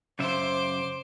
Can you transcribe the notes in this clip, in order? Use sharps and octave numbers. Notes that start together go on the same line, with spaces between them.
F#2 C#3 C5 E5 D6